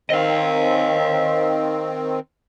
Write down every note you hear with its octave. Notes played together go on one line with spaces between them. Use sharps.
D#3 C4 D#5 F5